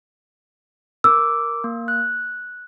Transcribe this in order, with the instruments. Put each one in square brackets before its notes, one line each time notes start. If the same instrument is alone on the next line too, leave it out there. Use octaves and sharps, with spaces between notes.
[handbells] A#4 D6 [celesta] E6
[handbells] A#3
F#6